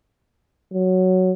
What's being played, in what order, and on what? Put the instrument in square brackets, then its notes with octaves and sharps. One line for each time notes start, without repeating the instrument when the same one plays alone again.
[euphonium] F#3